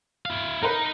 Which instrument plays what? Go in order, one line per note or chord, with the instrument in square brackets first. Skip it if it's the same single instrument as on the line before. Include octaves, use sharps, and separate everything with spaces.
[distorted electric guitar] E4 F5
[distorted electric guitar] D#4 [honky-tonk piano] A#4 B4